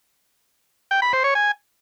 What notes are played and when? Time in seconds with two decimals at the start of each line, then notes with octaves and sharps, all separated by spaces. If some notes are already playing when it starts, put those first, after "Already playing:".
0.91 G5
1.02 B5
1.13 C5
1.24 C#5
1.35 G#5